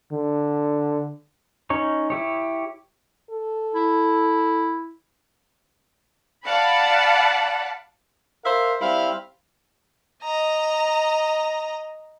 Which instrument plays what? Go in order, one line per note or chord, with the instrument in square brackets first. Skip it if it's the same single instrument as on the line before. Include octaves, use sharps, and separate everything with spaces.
[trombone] D3
[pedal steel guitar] C#4 D#4 C#5
E4 G4 C#5
[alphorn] A4
[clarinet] E4
[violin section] D5 F5 F#5 A5 B5
[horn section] A#4 C5 E5 F5
G3 C4 E4 E5 F5
[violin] D#5 A#5